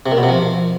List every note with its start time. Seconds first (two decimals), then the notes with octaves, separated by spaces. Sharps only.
0.06 C3
0.11 A#2
0.17 B2
0.23 C3
0.29 F3